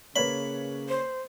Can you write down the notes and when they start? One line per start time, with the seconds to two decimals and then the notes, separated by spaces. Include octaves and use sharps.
0.16 C#3 A#3 B4 C#5 B5
0.89 C5